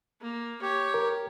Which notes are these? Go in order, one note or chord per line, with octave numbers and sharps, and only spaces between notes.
A#3
G4 C#5
A#4